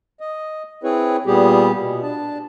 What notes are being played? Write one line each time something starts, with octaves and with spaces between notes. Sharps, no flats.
D#5
C4 E4 G#4 B4 C#5
A#2 G3 B3 G4 G#4
B2
D4 A5